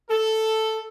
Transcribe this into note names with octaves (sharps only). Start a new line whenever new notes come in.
A4